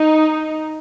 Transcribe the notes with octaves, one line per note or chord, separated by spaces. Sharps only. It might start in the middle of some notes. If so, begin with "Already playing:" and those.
Already playing: D#4